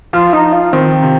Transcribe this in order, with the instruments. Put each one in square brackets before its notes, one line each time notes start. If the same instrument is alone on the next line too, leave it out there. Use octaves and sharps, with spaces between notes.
[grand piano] F3 [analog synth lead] F4
[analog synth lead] D#4
F4
[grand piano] D#3 [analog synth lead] C4
[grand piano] C3